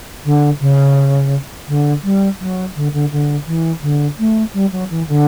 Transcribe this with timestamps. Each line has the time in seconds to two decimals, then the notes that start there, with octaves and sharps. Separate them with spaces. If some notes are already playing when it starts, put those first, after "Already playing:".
0.25 D3
0.60 C#3
1.68 D3
2.03 G3
2.40 F#3
2.75 D3
2.93 D3
3.11 D3
3.46 E3
3.82 D3
4.18 A3
4.53 G3
4.72 F#3
4.90 E3
5.08 D3